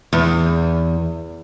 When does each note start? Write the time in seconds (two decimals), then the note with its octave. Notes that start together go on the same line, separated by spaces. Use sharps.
0.13 E2